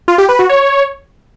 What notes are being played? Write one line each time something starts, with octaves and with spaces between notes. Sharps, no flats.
F4
G4
B4
F#4
C#5